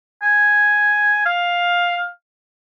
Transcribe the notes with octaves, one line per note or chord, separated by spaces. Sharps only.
G#5
F5